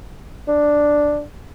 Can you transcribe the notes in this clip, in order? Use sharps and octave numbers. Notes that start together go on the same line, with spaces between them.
D4